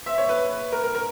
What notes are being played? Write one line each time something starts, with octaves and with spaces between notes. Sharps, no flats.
E5
C#5
B4
A#4
A#4
A#4